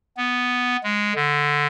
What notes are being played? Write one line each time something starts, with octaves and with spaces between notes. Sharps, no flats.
B3
G#3
D3